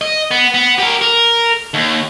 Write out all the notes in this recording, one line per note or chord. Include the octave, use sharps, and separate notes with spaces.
D#5
B3
B3
G4 A#4
A#4
D#2